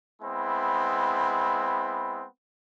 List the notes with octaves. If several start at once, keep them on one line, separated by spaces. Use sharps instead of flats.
G#3 B3 C4 E4